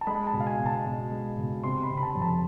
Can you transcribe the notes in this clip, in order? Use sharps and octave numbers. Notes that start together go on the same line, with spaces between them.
A5
G#3 B5
A5
B2
F5
G#5
B2
A5
B2
G#3
B2
C3 C6
B5
C3
B5
A5
F2
A5